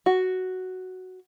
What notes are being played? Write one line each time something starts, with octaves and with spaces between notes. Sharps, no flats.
F#4